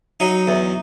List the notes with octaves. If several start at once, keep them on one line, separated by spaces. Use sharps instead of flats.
F#3 D#4
E2